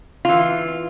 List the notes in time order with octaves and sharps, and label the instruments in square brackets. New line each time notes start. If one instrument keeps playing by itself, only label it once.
[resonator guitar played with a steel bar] E3 F4